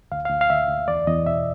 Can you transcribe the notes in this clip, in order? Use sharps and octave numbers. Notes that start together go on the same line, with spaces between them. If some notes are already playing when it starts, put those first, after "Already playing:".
D2 F5
F5
D2
F5
D2 E5
D2
E2 D5
E2 D#5
B2 E5